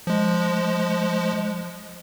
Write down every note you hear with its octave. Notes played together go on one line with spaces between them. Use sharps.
F3 G#3